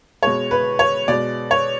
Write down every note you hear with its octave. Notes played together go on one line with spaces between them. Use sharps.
B2 G#3 C#5
B4
C#5
B2 G#3 D5
C#5